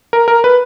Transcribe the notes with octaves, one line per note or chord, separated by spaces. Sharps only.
A#4
A#4
B4